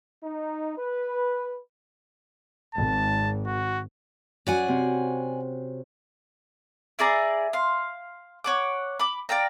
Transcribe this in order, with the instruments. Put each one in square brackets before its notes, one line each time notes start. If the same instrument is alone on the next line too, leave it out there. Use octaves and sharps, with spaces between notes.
[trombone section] D#4
B4
[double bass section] G#1 [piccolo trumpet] A5
[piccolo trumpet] F#4
[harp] F#2 F#4 [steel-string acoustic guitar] D5 F#5 G#5
[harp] C3 C4
[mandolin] E4 G#4 D5 A#5
F5 C6
C#5 F#5 D6
B5 D6
D5 F5 G5 A#5